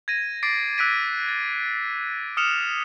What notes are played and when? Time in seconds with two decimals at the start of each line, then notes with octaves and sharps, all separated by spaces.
0.08 G#6 A#6 D#7
0.43 D6 A6 C7 D7
0.78 E6 F#6 A6 B6 D7 D#7
1.28 A6
2.37 D#6 F6 C#7 E7 F7